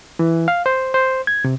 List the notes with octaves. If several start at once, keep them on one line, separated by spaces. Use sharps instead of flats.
E3
F5
C5
C5
G#6
C3